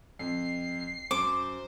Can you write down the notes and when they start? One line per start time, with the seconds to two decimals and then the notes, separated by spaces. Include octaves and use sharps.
0.19 F2 C7
1.11 F#2 C5 D6